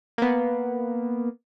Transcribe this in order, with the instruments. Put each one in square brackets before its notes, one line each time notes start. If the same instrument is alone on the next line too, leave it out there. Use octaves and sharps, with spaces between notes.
[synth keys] A#3 B3